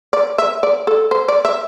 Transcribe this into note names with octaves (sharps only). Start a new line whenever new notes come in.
D5
E5
D5
A4
C5
D5
E5